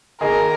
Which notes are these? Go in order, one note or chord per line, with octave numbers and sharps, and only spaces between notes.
D#3 A#3 D#4 G#4 A#4